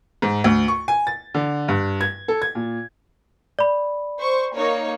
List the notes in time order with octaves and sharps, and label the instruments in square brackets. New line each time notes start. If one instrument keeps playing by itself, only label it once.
[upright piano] G#2
D2
C#6
G#5
A6
D3
G2
G#6
A4
G#6
A#2
[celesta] D5 B5
[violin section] C5 C#6
A#3 D#4 C#5